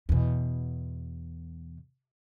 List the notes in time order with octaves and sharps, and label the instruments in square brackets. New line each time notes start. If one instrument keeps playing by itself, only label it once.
[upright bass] E2 B2